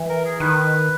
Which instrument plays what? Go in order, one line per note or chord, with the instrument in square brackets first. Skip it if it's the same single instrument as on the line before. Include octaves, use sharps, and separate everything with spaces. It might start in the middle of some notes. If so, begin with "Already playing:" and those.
Already playing: [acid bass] E3
[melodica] A#4
G#4
[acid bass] D#3 [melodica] B4